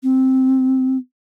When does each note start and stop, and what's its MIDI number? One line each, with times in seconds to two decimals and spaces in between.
0.03 0.97 60